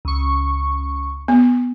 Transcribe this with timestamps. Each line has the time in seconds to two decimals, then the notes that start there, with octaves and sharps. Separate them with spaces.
0.05 C#2 C#6
1.28 B3